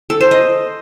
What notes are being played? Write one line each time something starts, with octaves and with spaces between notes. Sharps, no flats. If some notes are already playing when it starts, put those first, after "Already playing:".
A4
C5
D#5